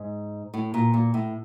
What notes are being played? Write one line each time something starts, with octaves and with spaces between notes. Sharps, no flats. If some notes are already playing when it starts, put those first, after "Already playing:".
Already playing: G#2
A2
A#2
A#2
A2